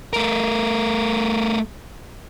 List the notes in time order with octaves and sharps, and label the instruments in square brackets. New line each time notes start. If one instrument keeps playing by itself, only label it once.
[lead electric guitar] A3 A#4